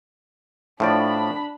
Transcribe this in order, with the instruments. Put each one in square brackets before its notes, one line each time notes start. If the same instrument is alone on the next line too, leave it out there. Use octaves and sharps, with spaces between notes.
[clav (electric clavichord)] A2 F3 D5 [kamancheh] D4 B5